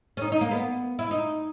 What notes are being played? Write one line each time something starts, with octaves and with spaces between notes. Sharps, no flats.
C#4
D#4
D#4
A#3
B3
E4
D#4